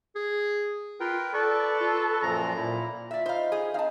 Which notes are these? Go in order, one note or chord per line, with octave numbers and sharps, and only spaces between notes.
G#4
F4 A#4 B4 G5
A4 B4 D5 C#6
F4
F#2 A#2 F3 A#5
A#2 E4
F4 D5 E5
D#4 C5 F5 B5
G#4
C4 D#4 F5 G#5 A5